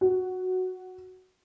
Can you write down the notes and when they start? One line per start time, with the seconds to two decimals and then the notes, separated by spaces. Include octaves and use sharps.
0.01 F#4